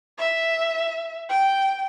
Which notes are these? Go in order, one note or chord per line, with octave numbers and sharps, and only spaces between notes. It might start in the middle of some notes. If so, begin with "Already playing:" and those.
E5
G5